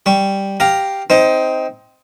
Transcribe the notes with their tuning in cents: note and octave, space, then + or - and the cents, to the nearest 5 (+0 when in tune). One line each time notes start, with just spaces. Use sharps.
G3 +0 C#6 +15
G4 +0 F5 +0 A#5 +0
C4 -5 D#4 +20